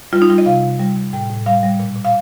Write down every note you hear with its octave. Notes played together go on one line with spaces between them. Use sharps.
G3 F4
D#4
G3 F4
D#5
C3 F5
C3
G3
G3
A2 G5
A2
G3 F5
G3
A#2
A#2
F5